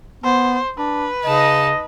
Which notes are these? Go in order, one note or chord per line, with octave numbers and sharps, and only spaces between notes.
B3 C5
D4 B4
C#3 D#4 D#5 A5